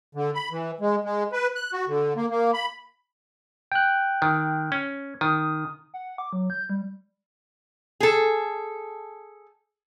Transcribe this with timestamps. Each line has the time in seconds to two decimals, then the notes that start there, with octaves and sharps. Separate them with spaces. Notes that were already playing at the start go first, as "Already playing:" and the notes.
0.15 D3
0.35 B5
0.51 E3
0.81 G#3
1.04 G#3
1.32 B4
1.55 F#6
1.73 F#4
1.88 D3
2.16 A#3
2.30 A#3
2.54 B5
3.72 G5 F#6
4.22 D#3
4.72 C#4
5.21 D#3 D#6
5.94 F#5
6.18 D6
6.33 F#3
6.50 G6
6.69 G3
8.00 G#4 A4